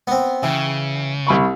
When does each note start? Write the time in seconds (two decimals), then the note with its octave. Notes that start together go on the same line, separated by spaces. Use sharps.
0.07 B3 C4
0.43 C#3 E3 G5
1.27 C2 B5 C#6